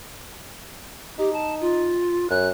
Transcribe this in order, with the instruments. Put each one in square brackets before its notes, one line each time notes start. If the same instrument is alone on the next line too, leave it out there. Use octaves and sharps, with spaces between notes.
[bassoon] D#4 [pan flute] G4
[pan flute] A5
F4
[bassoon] F#2 [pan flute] F#6